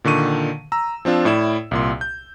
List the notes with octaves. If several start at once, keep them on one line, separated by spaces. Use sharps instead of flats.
A#2 D3 D#3 C#6 D#7
A#5 E6
F3 C4 D4 F4
A2 E4 D5 E7
C2 A#2 C6
G6